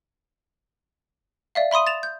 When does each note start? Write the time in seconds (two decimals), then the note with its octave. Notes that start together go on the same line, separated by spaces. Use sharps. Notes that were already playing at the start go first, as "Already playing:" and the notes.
1.55 D5 E5 F5
1.71 E5 B5 C6 D#6 D#7
1.87 A6 E7 F7
2.03 G6